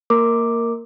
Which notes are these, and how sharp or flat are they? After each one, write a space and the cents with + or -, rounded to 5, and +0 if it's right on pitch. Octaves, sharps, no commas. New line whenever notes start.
A#3 -15 A#4 -5 D6 +0